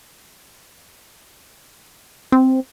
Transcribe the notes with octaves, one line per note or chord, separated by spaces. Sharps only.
C4